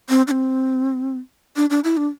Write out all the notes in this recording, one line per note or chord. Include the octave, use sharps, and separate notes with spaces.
C4
D4
C4
D4
D4
E4
D4